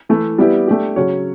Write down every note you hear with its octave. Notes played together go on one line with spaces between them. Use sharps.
E3 A3 E4
G3 B3 E4 G4 B4
A3 D4 G4
C#3 F#3 C#4 F#4 C#5